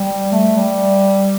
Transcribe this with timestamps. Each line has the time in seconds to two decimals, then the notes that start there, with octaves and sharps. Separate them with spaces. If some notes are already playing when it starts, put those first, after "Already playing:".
Already playing: G3
0.32 A3
0.57 G3